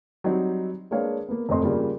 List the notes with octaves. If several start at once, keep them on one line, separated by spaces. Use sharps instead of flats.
F#3 G3 C4 D#4
G#3 A#3 D4 B4 C#5 F5
A#3 B3
F1 F2 A2 C5 D#5 C6
C#3 F3 G3 A#3